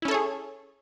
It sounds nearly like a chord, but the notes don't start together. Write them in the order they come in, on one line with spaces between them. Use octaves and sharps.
E4 C#4 A4 C#5 G#4